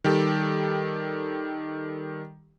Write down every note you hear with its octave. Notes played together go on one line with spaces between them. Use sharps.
D#3 G3 G4 A4